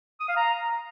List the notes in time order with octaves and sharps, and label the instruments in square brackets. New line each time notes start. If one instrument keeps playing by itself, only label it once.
[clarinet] D#6
F5
A#5